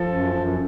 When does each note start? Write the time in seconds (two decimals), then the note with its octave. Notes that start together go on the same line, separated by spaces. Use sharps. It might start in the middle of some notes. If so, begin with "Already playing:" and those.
Already playing: F3 A4
0.09 F#2
0.35 F#2